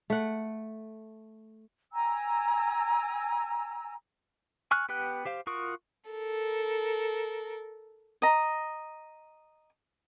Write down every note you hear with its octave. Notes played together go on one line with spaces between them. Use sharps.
A3 F#5
G5 G#5 A#5 E6
G#5 C#6 F6 F#6
B3 G4 B4 G5 F#6
G4 C5 F5
F4 F#4 A#4 C#6 D#6
A4 A#4
D#5 A#5